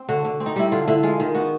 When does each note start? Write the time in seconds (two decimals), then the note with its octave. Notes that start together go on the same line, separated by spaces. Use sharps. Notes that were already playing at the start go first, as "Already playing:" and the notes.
Already playing: C4
0.09 D3 F#4
0.25 D3
0.40 C4
0.46 D#4
0.56 G3 E4
0.72 D3 F4
0.87 D3 E4
1.03 G#3 F4
1.20 D#3
1.35 B3 F#4